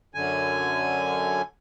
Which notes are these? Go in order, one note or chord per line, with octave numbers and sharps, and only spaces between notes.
F#2 D3 G#5